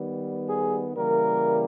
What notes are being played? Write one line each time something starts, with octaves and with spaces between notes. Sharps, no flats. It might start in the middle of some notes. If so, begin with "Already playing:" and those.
Already playing: D#3 G3 B3
G#4
C#3 E3 G3 A#3 A#4